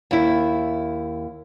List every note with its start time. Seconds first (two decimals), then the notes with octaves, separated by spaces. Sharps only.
0.11 D#2 E4